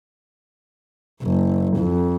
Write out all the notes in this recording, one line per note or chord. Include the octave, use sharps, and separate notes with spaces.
F#1
F2